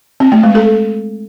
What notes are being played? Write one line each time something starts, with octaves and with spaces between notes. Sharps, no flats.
C4
A3
G#3
A4